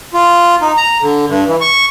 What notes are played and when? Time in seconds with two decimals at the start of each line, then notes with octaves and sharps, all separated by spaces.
0.14 F4
0.62 D#4
0.77 A#5
1.01 D3
1.28 G2
1.47 E3
1.61 C#6